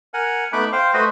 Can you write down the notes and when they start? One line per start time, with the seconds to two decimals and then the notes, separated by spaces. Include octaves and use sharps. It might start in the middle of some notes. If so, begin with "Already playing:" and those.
0.14 A#4 F#5 G#5
0.53 A3 B3 D#4 B5 D6 F#6
0.73 C5 F5 G5
0.94 A3 F#4 B4 C5 D#5